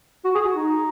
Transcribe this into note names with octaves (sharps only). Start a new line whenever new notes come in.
F#4
G#4
F#4
D#4